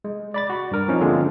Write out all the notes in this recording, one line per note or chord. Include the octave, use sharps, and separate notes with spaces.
G#3
D5 B5 A6
F#4
G2 A#4
F3 C4 C#4 D#4
D3 F3 G#3 A#3 C4 C#4